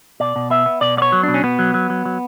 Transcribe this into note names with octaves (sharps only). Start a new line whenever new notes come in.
B2 D5
B2
B3 E5
B3
B2 D5
B3 C#5 D5
F#3
B2 D4
C#4
B2 B3
F#3
F#3
F#3
F#3